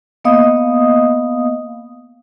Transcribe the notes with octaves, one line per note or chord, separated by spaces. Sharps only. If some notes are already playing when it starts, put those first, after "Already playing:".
A#3 B3 D#5 F5 D#6